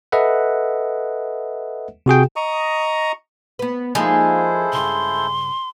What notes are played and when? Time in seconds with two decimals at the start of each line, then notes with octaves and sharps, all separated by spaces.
0.12 A4 B4 D#5 E5 F#5
2.06 C3 F#4 G#4 G5
2.36 D#5 A#5 C#6 D#6
3.59 B3 B4
3.95 F3 G#3 A#3 D#4 E4 A4 C5
4.73 G2 C#3 C6